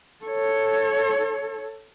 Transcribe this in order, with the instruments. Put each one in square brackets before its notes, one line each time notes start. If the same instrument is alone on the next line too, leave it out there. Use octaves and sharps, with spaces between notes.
[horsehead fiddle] A4 C#5